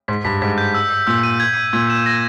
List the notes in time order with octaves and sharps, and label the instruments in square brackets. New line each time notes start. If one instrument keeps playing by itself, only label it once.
[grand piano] G#2 [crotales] B6
[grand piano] G2 [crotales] B6
[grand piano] G#2 [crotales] B6
[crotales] G6
E6
E6
[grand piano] A#2 [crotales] E6
[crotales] D#7
G#6
G#6
[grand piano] A#2 [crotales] G#6
[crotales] E7
A#6